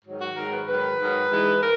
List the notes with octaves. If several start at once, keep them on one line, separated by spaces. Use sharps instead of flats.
G#2 D#3 F#3
F#4
G#2 D#3 F#3 A#4
B4
G#2 D#3 F#3 B4
G#2 D#3 F#3
G#2 E3 G#3
A#4